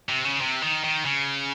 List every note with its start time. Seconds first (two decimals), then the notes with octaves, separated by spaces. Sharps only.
0.09 C3
0.25 C#3
0.41 C3
0.62 D#3
0.84 D#3
1.05 C#3